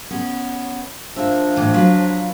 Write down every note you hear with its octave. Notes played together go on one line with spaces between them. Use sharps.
B3 C#4
F3 A#3 D4 E5
A2 E3
F#3 F4 B4